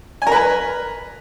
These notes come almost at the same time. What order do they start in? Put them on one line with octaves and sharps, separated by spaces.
G#5 A#4 B4